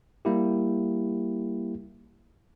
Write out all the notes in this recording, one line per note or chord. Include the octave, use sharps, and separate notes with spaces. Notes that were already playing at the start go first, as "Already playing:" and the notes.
G3 A#3 E4 G4